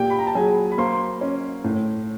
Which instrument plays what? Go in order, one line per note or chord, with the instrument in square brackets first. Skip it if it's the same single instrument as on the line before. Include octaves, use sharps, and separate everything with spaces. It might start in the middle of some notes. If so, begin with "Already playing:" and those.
Already playing: [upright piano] A#2 [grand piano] G4 G5
[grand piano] B5
A#5
A5
[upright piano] F#3 [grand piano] G#4 G#5
[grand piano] B5
[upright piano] A#3 [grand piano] C5 C6
[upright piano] C#4
A2